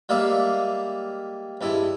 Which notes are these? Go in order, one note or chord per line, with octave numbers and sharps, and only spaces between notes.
G3 G#3 A#3 G#4 E5 F5
G2 G#3 E4